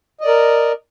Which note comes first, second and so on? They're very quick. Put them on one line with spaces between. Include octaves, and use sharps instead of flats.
D#5 D5 A#4